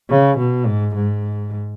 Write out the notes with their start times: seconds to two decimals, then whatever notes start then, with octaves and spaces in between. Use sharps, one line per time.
0.09 C#3
0.38 B2
0.66 G#2
0.95 G#2